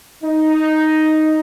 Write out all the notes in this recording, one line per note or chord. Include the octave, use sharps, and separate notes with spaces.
D#4